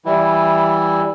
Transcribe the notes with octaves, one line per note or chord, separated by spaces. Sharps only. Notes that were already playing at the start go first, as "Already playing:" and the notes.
E3 G3 E4